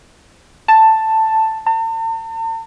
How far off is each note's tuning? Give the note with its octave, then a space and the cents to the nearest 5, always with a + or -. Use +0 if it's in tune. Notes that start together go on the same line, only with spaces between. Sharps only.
A5 +5
A5 +45